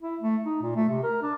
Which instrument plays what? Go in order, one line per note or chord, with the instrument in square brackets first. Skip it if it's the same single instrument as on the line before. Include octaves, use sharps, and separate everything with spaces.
[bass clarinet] E4
A3
D#4
A#2
A3
C3
A#4
D4